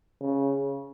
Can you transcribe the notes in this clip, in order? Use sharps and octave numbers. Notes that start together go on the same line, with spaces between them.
C#3